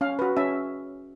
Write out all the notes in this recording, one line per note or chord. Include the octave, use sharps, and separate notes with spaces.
C#4 F5
F#4 B4
C#4 E5